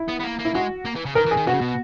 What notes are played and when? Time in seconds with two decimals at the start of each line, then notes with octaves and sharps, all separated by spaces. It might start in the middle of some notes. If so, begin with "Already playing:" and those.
Already playing: E4
0.09 B3
0.20 B3
0.24 A#3
0.39 A#3
0.45 E4
0.55 G#3 F#4
0.85 A#3
0.95 E3
1.06 C#3
1.15 D#3 A#4
1.26 E3
1.31 G#4
1.37 D#3
1.47 B2 F#4
1.54 C#3
1.61 B2